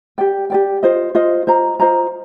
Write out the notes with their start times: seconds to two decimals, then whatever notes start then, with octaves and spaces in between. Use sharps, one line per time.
0.18 G4 D5 G5
0.50 G4 D5 G5
0.83 F4 C5 D#5
1.15 F4 C5 D#5
1.47 F4 C5 D#5 A#5
1.80 F4 C5 D#5 A#5